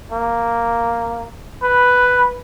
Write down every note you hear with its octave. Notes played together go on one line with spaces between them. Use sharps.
A#3
B4